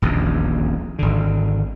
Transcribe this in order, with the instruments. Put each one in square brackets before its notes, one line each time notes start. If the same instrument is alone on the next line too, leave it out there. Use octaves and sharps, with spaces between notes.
[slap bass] D#1 A#1 E2
G#1 D3